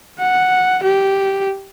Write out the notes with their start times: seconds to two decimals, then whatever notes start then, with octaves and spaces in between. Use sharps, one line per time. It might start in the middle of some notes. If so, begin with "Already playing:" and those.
0.19 F#5
0.83 G4